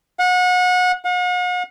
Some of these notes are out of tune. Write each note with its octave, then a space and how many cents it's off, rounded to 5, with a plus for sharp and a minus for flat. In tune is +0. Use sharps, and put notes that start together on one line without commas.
F#5 -30
F#5 -45